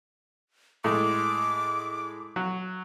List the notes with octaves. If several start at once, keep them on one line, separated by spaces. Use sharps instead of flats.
A2 G#3 D6
F#3